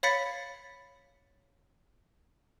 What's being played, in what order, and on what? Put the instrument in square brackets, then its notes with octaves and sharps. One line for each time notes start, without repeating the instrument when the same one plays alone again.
[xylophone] C#5 F5 B5 A6 B6 C#7